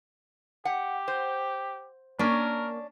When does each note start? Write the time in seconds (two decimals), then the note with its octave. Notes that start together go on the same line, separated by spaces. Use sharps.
0.65 G4 F#5
1.08 C5
2.19 A#3 C#4 D4 A#4